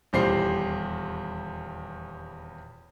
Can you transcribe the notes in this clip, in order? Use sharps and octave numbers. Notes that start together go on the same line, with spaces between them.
D#1 E2 G3 C5 C7